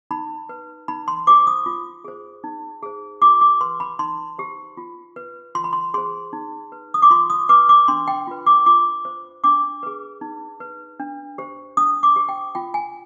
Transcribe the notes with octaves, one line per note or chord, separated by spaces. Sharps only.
D#4 B5
B4
D#4 B5
C6
G4 C5 D6
D#6
F4
G#4 C5
D#4
G#4 C5
F4 D6
D6
B4 C6
B5
D#4 C6
G4 C5
F4
B4
F4 C6
B5
C6
G#4 C5 C6
D#4
B4
D#6
D6
F4 C6
D#6
B4 D6
D6
D4 C6
G5
F4 B4
D6
F4 D6
C5
D4 D6
G#4 B4
D#4
B4
D4
G4 C5
D4 D#6
D6
G4 C5
G5
F4 G5
G#5